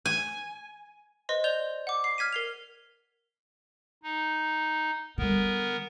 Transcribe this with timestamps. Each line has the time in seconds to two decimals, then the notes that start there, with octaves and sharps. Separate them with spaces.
0.06 G#5
1.29 B4 C5 D#5 C6
1.44 D5 G6 F7 G7
1.87 F#5 D6
2.04 C7
2.18 F6 G#6 B6 D#7
2.33 A#4 C7 F7
4.03 D#4
5.18 D3 G3 B3 A#4